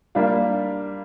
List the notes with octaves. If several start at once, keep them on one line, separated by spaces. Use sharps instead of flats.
G3 A#3 D4 F4